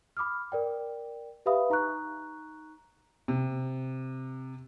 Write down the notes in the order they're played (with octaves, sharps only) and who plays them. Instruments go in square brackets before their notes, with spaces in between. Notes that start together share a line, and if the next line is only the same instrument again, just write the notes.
[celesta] B5 D6 D#6 F6
A#4 D5 G5
G4 B4 E5 F5 B5 D#6
D#4 A#5 C#6 F#6
[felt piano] C3